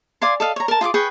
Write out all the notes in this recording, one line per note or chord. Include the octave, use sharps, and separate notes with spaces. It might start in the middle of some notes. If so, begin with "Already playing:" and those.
D5 F5 G#5 C6
A4 D#5 F5
C#5 A#5
A#4 A5
F4 G#4 E5 D6
G#4 B4 G5 C#6